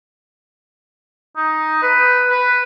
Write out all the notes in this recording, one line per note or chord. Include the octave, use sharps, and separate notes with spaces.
D#4
B4
B4